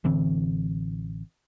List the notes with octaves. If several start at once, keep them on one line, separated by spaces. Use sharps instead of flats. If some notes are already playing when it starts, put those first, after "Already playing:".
A1 D3 E3 C4